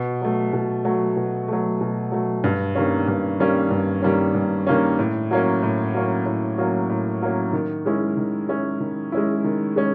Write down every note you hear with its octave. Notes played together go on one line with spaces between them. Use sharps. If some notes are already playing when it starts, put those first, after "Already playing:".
Already playing: B2
F#3 A3
B2
F#3 A3
B2
F#3 A3
B2
F#3 A3
G2
D#3 G3 A#3 C#4
G2
D#3 G3 A#3 C#4
G2
D#3 G3 A#3 C#4
G2
D#3 G3 A#3 C#4
A2
F#3 A#3 C#4
A2
F#3 A#3 C#4
A2
F#3 A#3 C#4
A2
F#3 A#3 C#4
D#3
G#3 C#4 E4
D#3
G#3 C#4 E4
D#3
G#3 C#4 E4
D#3
G#3 C#4